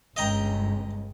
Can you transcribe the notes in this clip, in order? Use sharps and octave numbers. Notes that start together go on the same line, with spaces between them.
G1 C#2 D#5 G5 A#5